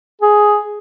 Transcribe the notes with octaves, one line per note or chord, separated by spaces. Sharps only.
G#4